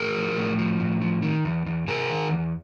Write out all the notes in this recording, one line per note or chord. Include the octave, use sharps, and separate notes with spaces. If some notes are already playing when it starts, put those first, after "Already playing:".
Already playing: A2 G#4 A#4
F3
A2
F3
A2
F3
D#3
E2
E2
C3 G#4 A#4
D#3
E2